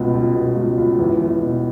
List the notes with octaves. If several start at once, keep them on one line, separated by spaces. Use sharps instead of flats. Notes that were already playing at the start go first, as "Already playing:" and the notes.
Already playing: C#2 B2
C#2
B2
C#2
C#2
E2
E2
B2